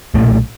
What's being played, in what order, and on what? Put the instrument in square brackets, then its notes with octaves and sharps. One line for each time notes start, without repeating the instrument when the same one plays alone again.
[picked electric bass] B1 A#2 A3